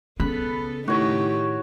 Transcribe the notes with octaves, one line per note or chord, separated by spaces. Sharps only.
C#3 B3 A4 B5 F#6 B6
A2 D#3 D#4 E4 F#4 G4 C#5